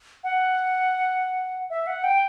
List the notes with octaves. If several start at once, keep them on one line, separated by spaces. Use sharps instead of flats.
F#5
E5
F#5
G5